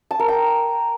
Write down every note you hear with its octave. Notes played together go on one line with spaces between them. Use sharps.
A5
A#4
G5